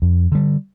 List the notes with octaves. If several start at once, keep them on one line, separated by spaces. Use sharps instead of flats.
F2
D3 G3